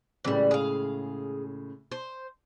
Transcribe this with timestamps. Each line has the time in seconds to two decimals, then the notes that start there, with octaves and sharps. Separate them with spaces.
0.25 A2 C#3 E3 G3 G#3
0.51 G#4 F5
1.91 C5